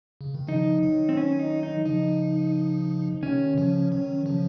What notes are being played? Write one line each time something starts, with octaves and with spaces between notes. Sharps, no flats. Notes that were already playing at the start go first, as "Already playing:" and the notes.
C#3
D#3
C#3 F3 D#4
D#3 F#3
C4
C#4
D#4
D#4
C#3 F3 D#4
C3 D#3 C#4
C#3 F3
D#3 F#3
C#3 F3